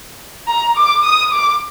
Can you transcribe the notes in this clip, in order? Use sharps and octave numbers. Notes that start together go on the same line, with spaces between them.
A#5
D6
D#6
D6